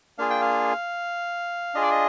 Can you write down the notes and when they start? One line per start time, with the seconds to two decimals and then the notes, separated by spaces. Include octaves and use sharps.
0.18 A#3 D4 F4 G#4 F5
0.30 G5
0.41 F5
1.74 D4 F4 G#4 D#5
1.82 D5
1.91 D#5